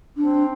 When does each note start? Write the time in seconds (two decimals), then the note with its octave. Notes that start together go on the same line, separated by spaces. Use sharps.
0.17 C4 D4